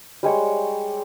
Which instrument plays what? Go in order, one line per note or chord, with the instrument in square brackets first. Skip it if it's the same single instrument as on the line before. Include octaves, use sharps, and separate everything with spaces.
[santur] G3 G#3 C#5 D5